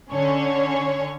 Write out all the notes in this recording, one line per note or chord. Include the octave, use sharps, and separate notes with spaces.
D3 C#4 C#5